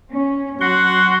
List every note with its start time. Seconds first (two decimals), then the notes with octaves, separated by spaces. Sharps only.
0.12 C#4
0.61 F#3 F#4 F#5 C6